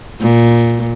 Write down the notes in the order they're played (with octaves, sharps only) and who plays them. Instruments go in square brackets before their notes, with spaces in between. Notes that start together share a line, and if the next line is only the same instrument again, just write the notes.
[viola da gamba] A#2